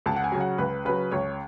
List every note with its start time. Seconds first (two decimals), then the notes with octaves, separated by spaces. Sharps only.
0.06 C#2 A5
0.16 F#5
0.24 G#5
0.32 C#3 F#3
0.41 F#5
0.58 C#2 B4
0.85 C#3 F#3 B4
1.12 C#2 C#5